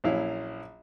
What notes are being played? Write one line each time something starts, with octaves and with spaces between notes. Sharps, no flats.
A#1 F#3 C#4 E4 F5